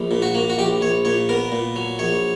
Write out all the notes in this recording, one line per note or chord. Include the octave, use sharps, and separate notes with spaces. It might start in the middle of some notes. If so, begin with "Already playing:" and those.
Already playing: A#1
A#2
F#4
A#3
F#4
A#1 G4
A#1 C#5
A#2 C#5
B3 A#4
A#2
F#3
A#1 C#5